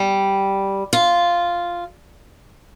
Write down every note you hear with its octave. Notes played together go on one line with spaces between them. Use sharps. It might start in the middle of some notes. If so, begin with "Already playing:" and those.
Already playing: G3
F4